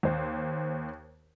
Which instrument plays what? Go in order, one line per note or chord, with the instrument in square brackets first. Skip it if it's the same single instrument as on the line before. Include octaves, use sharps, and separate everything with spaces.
[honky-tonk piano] D#2 C5